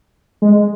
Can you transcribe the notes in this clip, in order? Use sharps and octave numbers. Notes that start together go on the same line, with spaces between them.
G#3